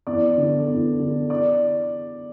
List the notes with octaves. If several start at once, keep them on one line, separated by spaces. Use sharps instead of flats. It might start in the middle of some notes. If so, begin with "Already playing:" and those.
E2 D5
D3
E2
D3
D5